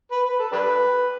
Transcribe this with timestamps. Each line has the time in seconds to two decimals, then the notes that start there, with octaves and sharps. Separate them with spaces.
0.11 B4
0.26 B4
0.39 A4
0.52 D4 G4 B4